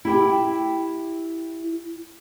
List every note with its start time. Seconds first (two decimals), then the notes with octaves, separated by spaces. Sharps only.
0.05 E4 G4 G5